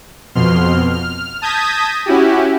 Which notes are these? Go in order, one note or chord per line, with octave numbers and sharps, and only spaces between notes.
F2 B2 C6 F6
F6
A5 D#6 G6 G#6 A#6 B6
C#4 E4 F#4 G4